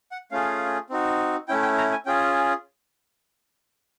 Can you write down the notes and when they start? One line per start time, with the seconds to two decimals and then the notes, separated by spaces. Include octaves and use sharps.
0.12 F#5
0.31 A3 C#4 F4 G#4 F5
0.90 C4 D#4 F#4
1.48 A3 C#4 E4 G5
1.62 G5
1.78 A#5
1.92 G#5
2.06 C#4 F4 G#4 G5